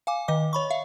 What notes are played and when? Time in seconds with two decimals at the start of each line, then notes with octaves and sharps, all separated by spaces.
0.07 F5 G#5 D6
0.28 D#3 D#5 D6
0.53 C#5 B5 C#6
0.70 E5 F5